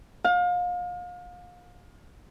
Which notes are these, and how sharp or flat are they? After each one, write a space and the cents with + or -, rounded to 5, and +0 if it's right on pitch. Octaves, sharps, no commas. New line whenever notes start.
F5 +35